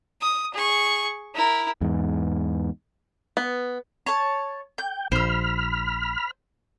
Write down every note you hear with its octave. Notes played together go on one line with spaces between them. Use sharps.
D#6
G#4 C#6
E4 A#4
E2 G#2
B3
C#5 A5
G5 G6
A#1 C5 B5 E6 F6